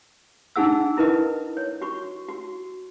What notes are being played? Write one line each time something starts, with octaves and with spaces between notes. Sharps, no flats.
D4 D#4 G#4 F#5 E6
D#4 E4 A#4 B4 D#5
C#5
F#4 C#6
F#4